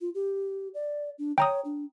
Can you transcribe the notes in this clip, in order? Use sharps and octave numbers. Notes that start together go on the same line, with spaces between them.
F4
G4
D5
D4
C#5 G5 A#5 D#6
D4